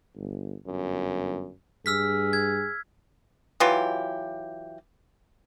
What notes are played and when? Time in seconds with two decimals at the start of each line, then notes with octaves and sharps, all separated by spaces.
0.16 G1
0.67 G1 F#2
1.86 G2 G#4 E6 F6 B6
2.33 G#6
3.60 E3 F#3 F4 G4